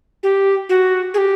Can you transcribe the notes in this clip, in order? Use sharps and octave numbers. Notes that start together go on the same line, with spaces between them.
G4
F#4
G#4
G4